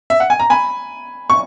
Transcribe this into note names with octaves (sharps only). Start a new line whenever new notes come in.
E5
F#5
G#5
A#5
G#5 B5
C#6